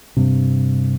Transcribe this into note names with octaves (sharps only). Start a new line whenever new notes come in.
G2 C3